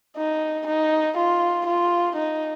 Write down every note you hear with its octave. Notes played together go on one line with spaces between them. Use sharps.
D#4
D#4
F4
F4
D#4